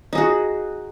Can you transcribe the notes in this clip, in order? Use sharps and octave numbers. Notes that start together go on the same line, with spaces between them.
D#4 F#4 G#4